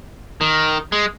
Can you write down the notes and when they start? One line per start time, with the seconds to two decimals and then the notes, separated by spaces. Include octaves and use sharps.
0.41 D#3
0.92 G#3